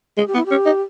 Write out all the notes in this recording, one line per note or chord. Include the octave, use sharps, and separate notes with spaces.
G#3 G#4
G4
B3
E4
C#4 G4
D#4